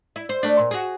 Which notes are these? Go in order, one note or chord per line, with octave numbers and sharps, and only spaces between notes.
E4
C5
A3 D4
A#2
F#4 G#4